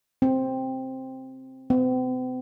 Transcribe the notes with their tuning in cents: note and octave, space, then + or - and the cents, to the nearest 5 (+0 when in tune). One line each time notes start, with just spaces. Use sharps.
C4 +5
C4 -45